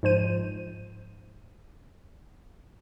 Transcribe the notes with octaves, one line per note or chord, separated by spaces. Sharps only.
G#2 F3 C5 D#7